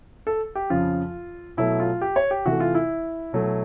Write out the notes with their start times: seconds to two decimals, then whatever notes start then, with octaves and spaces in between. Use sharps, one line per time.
0.27 A4
0.55 G4
0.70 F2 C#3 F3 F4
1.57 B2 F#3 A3 E4
1.80 F4
2.02 G4
2.16 C#5
2.31 G4
2.45 C3 E3 A3 F#4
2.60 F4
2.75 E4
3.33 B2 F#3 A3